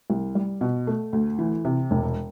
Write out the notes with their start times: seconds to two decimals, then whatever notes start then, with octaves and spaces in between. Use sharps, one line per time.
0.10 C2
0.35 G3
0.61 B2
0.87 A3
1.13 D2
1.39 E3
1.65 C3
1.91 E1